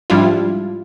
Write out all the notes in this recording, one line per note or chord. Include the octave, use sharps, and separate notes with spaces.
G#2 F3 G3 D4 E4 F4